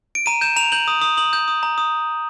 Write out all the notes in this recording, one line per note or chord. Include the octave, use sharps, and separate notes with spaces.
D7
A#5 D#7
G6 E7
A#5 F7
G6 F#7
D#6
D#6
D#6 F#7
G6
D#6
A#5
D#6